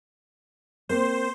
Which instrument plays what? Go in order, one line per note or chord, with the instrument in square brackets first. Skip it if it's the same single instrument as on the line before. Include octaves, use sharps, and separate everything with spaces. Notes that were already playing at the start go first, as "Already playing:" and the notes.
[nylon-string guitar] A#3 C4 [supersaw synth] C5